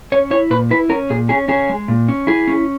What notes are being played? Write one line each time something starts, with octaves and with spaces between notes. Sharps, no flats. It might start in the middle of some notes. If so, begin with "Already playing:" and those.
C#4 C#5
E4 C#5
A#2 B4
E4 B4
C#4 A#4
A#2 G#4
C#4 G#4
C#4 G#4
G#3
A#2
C#4
E4 G#4
C#4